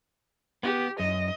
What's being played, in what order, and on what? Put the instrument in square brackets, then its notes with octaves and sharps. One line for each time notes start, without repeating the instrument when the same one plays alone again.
[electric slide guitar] B3 [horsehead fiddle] G4
[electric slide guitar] F#2 [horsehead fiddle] D#5